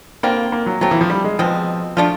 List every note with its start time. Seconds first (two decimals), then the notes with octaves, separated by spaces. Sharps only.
0.23 D3 G3 A#3 C4 F4
0.52 A#3
0.66 F#3
0.81 F#3 A3 C4 F4
0.91 E3
1.01 F3
1.10 G3
1.24 G#3
1.39 B2 F3 G#3 C4
1.97 F3 A3 D4 F4